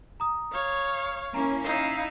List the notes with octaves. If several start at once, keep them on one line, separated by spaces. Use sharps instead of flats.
A#5 D#6
C#5 F5
A#3 C#4 E4 A#5
D#4 E4 F5